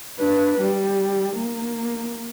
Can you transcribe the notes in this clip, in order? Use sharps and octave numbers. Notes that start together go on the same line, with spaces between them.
D4 B4
G3
A#3